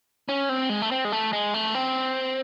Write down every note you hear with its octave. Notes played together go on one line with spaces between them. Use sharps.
C#4
C4
G#3
A3
C4
G#3
A3
G#3
A3
C4